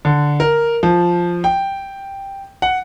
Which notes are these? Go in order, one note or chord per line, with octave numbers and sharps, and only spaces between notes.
D3
A#4
F3
G5
F#5